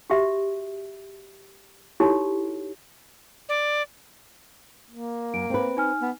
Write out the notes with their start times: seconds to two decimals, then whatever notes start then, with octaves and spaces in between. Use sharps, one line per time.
0.10 F#4 G4 E5
2.00 D#4 E4 F#4 G4 A4 C#5
3.49 D5
4.90 A#3
5.34 F#2 D7
5.50 C4 B4
5.77 D#4 G#5 F6
6.01 B3